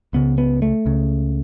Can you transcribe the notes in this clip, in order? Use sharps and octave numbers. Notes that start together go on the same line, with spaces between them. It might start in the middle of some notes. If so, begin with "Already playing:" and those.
C#2 C#3 B3
B3
A3
C#2 C#3